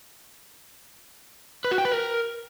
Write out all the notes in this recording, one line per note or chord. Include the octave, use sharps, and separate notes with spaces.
B4
F#4
G5
B4
A#4